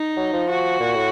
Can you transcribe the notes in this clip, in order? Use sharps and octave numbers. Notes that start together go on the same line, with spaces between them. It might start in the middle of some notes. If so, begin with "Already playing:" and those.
Already playing: D#4
F#3
F3
F#4
A#2
A2